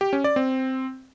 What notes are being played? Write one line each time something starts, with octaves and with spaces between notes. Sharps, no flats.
G4
C#4
D5
C4